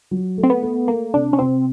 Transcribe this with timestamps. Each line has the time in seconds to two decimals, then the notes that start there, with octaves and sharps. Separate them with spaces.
0.11 F#3
0.38 A3
0.43 C4
0.50 B3
0.63 A3
0.88 A3 A#3
1.14 C3 D4
1.33 C#4
1.39 C3 C4